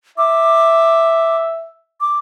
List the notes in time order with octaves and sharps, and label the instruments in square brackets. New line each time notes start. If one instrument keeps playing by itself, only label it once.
[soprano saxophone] E5 [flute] D6
[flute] D6